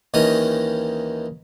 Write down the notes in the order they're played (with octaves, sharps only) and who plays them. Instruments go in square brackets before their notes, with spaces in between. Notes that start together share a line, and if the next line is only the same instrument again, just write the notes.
[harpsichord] D#2 D#3 E3 C#4 D#5